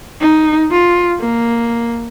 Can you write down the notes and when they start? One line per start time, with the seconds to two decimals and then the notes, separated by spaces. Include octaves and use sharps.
0.21 D#4
0.71 F4
1.20 A#3